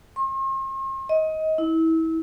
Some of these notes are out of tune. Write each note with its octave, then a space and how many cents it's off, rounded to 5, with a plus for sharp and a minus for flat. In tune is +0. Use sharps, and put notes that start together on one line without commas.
C6 +45
D#5 +20
E4 -30